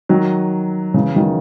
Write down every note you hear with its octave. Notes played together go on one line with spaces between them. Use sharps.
D#3 F#3
C#3 E3
D#3 F#3